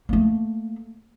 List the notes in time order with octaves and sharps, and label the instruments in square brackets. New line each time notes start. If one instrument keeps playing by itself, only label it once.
[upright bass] A3 A#3